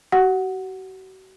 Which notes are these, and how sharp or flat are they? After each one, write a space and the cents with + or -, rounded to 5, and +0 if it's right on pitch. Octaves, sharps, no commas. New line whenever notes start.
F#4 +40 F#5 +0